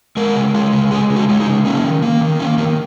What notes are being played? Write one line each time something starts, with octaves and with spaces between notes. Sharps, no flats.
G#3 A#4
C#3
G#3
C#3
G#3 G#4
C#3
F#4
G#3
D#4
C#3
A#3 C#4
D#3
A#3
D#3
A#3 C#4
D#3 A#3